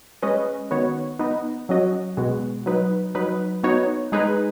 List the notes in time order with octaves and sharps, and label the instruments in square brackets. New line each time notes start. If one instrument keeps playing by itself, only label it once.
[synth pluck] G#3 C#4 B4 D#5
D#3 B3 F#4 C#5
B3 D#4 B4 D#5
F#3 C#4 F#4 D#5
B2 G#3 B3 F#4
F#3 D#4 B4
F#3 D#4 B4
B3 D#4 F#4 C#5
G#3 D#4 G#4 B4